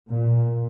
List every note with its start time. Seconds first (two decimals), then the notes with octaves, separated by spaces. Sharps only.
0.08 A#2